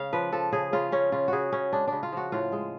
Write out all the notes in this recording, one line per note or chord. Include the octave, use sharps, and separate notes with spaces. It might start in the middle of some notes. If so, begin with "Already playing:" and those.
Already playing: C#3 F5
F3 B4
F3 A4
C#3 G#4
C#3 F4
C#3 C#4
C#3 F4
C#3 F#4 G#4
C#3 C#4
G#3 D4
C#3 D4
F4
F3 F#4
A2 F4
G#3